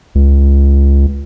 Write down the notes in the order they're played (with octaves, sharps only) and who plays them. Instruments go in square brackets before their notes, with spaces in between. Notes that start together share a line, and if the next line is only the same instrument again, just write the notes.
[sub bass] C#2